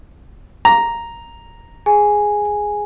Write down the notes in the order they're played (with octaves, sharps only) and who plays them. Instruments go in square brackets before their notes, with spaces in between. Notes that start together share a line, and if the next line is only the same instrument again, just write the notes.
[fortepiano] A#5
[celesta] G#4 G#5